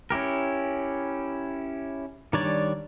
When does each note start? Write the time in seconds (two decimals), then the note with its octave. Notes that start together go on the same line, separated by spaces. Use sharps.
0.10 C#4 E4 G4 A#4
2.33 D#3 G3 D4 C#5 D5